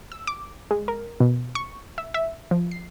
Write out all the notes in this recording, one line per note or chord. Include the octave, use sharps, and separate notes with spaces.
E6
D6
G#3
A#4
B2
C#6
E5
E5
F3
C7